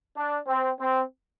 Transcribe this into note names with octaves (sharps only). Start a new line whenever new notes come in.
D4
C4
C4